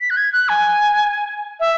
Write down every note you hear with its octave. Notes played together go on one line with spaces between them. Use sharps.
B6
F#6
G#6
F#6
G#5
E5